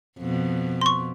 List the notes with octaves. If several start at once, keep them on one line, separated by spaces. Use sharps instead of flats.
F2 B2
C6 C#6